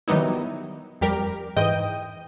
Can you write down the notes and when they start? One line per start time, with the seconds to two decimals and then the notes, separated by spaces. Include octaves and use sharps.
0.08 D#3 F#3 G3 B3 D#4 E4
1.01 F2 G3 G4 A#4
1.56 G#2 E3 D#5 G5 D#7